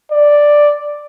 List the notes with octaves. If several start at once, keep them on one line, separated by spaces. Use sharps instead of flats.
D5